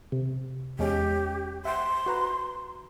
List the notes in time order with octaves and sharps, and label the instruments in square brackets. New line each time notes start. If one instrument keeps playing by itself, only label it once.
[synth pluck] C3
[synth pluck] E2 G#3 C#4 [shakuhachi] G4
[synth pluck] E5 F#5 G5 [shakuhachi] C6
[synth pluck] F#4 B4 A#5